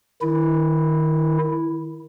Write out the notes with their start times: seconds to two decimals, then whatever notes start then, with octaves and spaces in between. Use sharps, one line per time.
0.22 D#3 E4